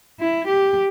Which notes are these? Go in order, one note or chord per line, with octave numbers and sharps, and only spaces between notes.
E4
G4